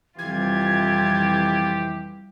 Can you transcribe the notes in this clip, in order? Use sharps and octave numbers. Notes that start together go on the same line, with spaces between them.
F2 C3 E3 G3 F4 G4 G#6